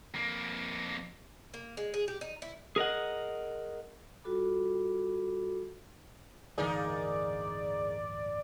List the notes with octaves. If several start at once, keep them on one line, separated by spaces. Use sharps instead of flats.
F2 A#3
A#3
G#3
G#4
G4
D#4
E4
G#4 A#4 D#5 F#5
G3 F4 F#4 A4 B5 D6
D1 G1 E3 A#3 D#4 G#4 D5